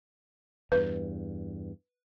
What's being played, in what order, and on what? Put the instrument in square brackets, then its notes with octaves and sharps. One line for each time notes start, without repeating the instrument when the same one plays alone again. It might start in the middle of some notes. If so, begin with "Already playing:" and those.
[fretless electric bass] E2 G2 [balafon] B4